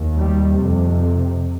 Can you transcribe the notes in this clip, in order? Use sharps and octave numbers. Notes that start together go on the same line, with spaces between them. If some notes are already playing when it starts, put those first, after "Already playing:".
Already playing: D#2
G3
F2 C3